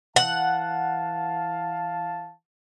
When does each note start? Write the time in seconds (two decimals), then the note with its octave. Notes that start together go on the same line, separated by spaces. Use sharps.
0.16 E3 F5 F#5 A5